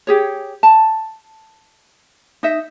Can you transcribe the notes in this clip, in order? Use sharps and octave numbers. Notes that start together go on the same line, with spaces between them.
G4 G#4 C#5
A5
D#4 D#5 E5